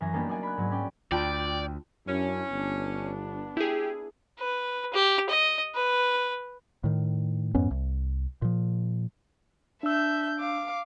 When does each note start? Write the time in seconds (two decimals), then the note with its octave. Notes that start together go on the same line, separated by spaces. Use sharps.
0.01 F#2 E3 G#5 A#6
0.13 G3 A#3 B3 D4 D#4 G4
0.29 D5 D#5 F#5 G#5 G#6
0.43 B5 F#6
0.57 G#2 F#3
0.71 C#4 D5 G5
1.12 D2 F4 D5 G5 A5 C6
2.07 F#2 C#4 D4 E4
2.51 G1 B3 D4
3.57 E4 G4 G#4
4.38 B4
4.93 G4
5.29 D#5
5.75 B4
6.84 A2 D#3
7.55 F2 G#2 B3 C#4
7.71 C2
8.42 A#2 F3
9.83 D4 E5 E6 G6
10.39 F5 D6